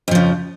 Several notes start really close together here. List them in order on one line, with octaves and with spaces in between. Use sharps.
F2 F3 C#3